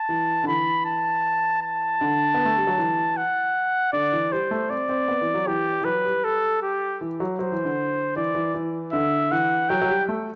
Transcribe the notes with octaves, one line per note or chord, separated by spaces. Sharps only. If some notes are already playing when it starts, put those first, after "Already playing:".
Already playing: A5
E3
D3
E3 B5
A5
A5
D3
B3
A3
G3
F#3
E3
F#5
D3 D5
E3
G3 C5
A3
C4 D5
C4
B3
E3
F#3
E3 G4
E3
F#3 B4
G3
A4
G4
E3
F#3
F#3 C5
E3
D3
E3 D5
E3
E3
D3 E5
E3 F#5
F#3 G5
F#3
G3
A3